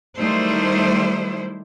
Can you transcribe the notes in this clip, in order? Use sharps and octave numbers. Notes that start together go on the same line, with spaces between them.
D#3 F#3 G3 A3 E4 C5